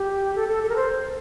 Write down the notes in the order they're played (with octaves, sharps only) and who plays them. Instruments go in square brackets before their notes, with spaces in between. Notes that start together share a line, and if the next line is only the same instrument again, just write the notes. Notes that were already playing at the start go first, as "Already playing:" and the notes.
Already playing: [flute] G4
A4
A4
A4
A#4
C5